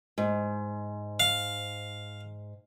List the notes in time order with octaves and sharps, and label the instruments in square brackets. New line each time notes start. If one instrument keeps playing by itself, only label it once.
[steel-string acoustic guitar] G#2
[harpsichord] F5